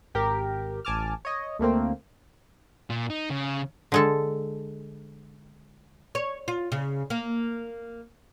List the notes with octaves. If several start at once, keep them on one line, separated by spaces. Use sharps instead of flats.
G#1 G4 A#4
A1 G#5 A5 D6 F6
C#5 D#5
D2 A3 A#3 C4
A#2
D#4
C#3
D3 G#3 A4
C#5
F4
C#3
A#3